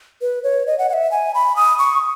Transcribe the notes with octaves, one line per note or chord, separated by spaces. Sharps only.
B4
C#5
D#5
F#5
F#5
E5
G#5
B5
D#6
C#6